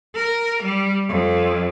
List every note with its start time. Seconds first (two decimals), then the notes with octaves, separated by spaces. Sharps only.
0.16 A#4
0.63 G3
1.09 F2